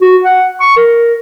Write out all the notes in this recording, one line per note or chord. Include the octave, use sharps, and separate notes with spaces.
F#4
F#5
C#6
A#4